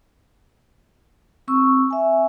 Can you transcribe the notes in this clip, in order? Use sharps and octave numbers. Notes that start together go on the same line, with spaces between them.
C4 C#6 E6
E5 G#5